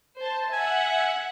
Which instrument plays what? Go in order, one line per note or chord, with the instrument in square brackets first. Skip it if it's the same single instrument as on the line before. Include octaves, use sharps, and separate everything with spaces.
[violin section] C5 A5
[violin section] E5 F#5 [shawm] G#5